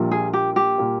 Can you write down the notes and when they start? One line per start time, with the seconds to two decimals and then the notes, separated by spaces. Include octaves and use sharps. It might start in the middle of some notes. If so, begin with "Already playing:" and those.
Already playing: A#1 A#2 G3 A#3
0.11 G#4
0.33 G4
0.56 G4
0.78 A#2 G3 A#3